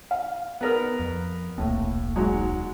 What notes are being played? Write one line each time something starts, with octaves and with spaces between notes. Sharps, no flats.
F5
B3 A#4 F6
F2
D#1 B1 A2 A#3
G#2 F#3 G#3